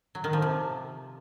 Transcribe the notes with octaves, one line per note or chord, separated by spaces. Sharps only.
F#3
D#3
F3
C3